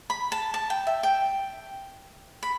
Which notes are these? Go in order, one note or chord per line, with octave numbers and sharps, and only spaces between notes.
B5
A5
A5
G5
E5
G5
B5